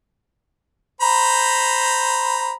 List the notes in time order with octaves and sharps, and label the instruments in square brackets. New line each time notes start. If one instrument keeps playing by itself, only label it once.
[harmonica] C5 A#5 B5